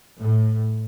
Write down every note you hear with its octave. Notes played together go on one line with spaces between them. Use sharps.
A2